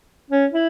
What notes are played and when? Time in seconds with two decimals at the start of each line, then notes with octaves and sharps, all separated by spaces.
0.31 C#4
0.52 E4